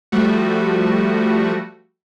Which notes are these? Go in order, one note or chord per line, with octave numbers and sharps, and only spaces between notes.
F3 G3 A3 F#4